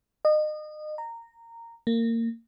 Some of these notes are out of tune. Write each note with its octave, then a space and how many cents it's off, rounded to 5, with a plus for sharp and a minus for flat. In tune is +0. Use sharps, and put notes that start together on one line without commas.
D#5 -30
A#5 -15
A#3 -25